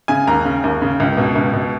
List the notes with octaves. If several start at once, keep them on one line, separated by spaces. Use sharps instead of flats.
C#3 G#5
D#2 A#5
C#3
D#2
C#3
C#2
B2
C#2
B2